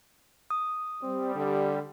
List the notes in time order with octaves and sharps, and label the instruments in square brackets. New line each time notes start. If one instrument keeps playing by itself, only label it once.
[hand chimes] D#6
[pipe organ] G3 [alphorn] C4
[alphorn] D3